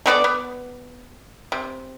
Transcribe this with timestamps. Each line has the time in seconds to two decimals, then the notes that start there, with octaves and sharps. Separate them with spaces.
0.06 A3 B3 A4 D5
0.24 B3
1.52 C3